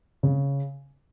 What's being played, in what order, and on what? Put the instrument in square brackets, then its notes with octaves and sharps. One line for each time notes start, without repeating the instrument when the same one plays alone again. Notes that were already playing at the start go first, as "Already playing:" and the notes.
[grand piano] C#3